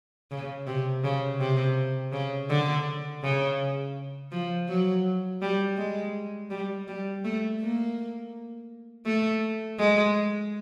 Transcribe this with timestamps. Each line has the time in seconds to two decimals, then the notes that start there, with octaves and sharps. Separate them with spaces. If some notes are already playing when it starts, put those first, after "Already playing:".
0.31 C#3
0.67 C3
1.04 C#3
1.40 C3
2.12 C#3
2.50 D3
3.23 C#3
4.32 F3
4.68 F#3
5.42 G3
5.77 G#3
6.50 G3
6.88 G3
7.24 A3
7.61 A#3
9.06 A3
9.79 G#3